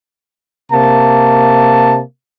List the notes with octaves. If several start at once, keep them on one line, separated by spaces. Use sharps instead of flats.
C3 A#3 A5